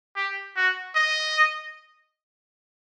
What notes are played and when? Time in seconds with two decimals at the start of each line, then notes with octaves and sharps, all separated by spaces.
0.16 G4
0.56 F#4
0.96 D#5